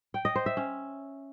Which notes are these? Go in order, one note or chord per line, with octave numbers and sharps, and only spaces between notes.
G5
D#5
C5
E5
C#4